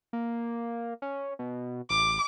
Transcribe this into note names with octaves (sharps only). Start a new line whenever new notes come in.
A#3
C#4
B2
A1 D6